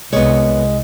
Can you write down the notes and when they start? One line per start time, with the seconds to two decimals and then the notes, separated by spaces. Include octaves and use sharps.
0.13 C2 G#3 B3 C#5